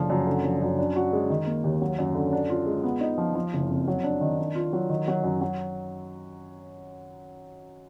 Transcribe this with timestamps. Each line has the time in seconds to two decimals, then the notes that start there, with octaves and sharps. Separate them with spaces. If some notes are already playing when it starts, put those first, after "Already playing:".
Already playing: F#1 D3 F3
0.10 F#2
0.27 D3
0.44 F3
0.62 F#2
0.79 D4
0.96 F#4
1.13 G#3
1.30 D#3
1.47 A#3
1.64 D#2
1.81 F#3
1.99 F#2
2.15 D3
2.33 D4
2.50 F4
2.67 G#3
2.84 B3
3.01 D#4
3.18 F3
3.35 F3
3.53 F#1
3.70 F2
3.88 F#3
4.04 D4
4.21 D#3
4.38 D4
4.55 F4
4.73 F#3
4.89 D#3
5.08 F#3
5.24 F#2
5.41 F#3